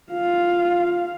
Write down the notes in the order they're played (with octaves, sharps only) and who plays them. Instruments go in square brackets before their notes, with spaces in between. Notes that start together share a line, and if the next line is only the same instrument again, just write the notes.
[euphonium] F4 [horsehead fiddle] F5